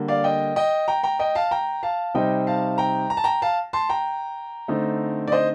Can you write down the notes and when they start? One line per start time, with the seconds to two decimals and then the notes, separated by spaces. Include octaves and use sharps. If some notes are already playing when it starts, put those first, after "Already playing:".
Already playing: D3 G3 A#3
0.08 D5 F5
0.24 D#5 G5
0.56 D#5 G5
0.88 G5 A#5
1.03 G5 A#5
1.19 D#5 G5
1.35 F5 A5
1.51 G5 A#5
1.83 F5 A5
2.14 C3 G3 C4 D#4 D#5 G5
2.47 F5 A5
2.78 G5 A#5
3.10 A#5
3.17 A5
3.24 G5 A#5
3.42 F5 A5
3.73 A5 C6
3.89 G5 A#5
4.68 D3 A3 C4 D#4
5.28 D5
5.32 C5 D#5